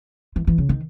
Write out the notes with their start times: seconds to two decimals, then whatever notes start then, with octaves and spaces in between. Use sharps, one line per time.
0.36 E3
0.47 E3
0.58 C#3
0.69 D#3